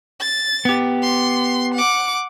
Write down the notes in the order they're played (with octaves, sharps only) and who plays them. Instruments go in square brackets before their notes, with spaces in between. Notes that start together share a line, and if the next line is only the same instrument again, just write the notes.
[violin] A6
[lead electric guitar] B3 G4
[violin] C6
F#5 D6